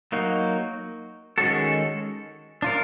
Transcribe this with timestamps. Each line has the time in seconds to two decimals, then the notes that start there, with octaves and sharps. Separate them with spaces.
0.12 F#3 A#3 D#4 F#4
1.38 D#3 G#3 C#4 F#4 A4
2.62 D4 F4 A#4